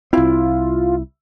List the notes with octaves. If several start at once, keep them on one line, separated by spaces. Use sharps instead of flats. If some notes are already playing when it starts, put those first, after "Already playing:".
C2 C4 E4 F4